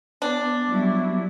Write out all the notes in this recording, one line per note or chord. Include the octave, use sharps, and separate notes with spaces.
B3 D4
F#3 G3 E4